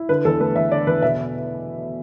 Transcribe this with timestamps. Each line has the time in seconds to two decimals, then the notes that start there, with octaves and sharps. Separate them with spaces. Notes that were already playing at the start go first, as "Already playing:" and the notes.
Already playing: E4
0.09 D3 B4
0.25 E2 A4
0.40 A3 B4
0.56 E2 E5
0.71 D3 D5
0.87 E2 B4
1.02 B2 E5